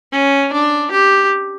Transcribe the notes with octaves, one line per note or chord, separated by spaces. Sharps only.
C#4
D4
G4